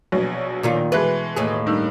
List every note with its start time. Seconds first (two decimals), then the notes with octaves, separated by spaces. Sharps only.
0.12 A#1 B2 F#3
0.63 A#2 D#3 F4
0.92 B2 E3 G#3 B4
1.36 D#2 A2 G#4
1.66 G2 D#3 E6